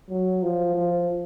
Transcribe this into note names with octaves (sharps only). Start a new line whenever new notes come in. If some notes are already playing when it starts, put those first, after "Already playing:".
F#3
F3
F3